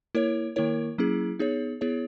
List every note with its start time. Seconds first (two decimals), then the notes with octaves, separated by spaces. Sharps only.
0.15 A#3 E4 A#4 C#5
0.56 D#3 A#3 E4 A#4 C#5
0.98 F#3 A#3 C#4 E4 G#4
1.39 B3 D#4 G#4 C#5
1.81 B3 E4 G#4 C#5